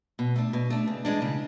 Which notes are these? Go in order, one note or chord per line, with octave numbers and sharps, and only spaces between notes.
B2
A3 D4
B2
A3 D4
C#3
E3 G#3 D4
C#3